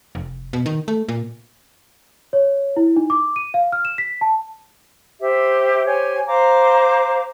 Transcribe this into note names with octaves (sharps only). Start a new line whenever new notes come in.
F1
B2
D#3
A3
A#2
C#5
E4
D#4
D6
D#7
F5
F6
E7
B6
A5
G4 C5 E5
G4 C5 C#5 G#5
C5 F5 A#5 D6